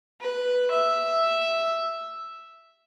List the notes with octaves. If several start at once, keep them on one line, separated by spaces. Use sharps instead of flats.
B4
E5